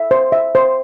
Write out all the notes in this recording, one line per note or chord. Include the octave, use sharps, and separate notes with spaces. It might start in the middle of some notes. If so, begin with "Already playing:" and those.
Already playing: E5
C5
E5
C5